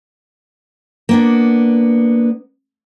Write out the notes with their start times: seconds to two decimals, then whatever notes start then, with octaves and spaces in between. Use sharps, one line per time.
1.09 A#3 B3 D4